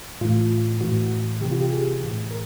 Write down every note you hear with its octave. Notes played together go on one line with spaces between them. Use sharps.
A2 E3 F4
A2 E3 F#4
C3 E3 G4
F4
G4
G#4
A2 E3
A#4